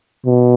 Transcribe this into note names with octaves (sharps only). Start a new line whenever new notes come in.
B2